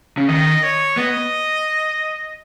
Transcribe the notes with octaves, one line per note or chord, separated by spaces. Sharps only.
C#3
D#3 D#5
C#5
B3 D#5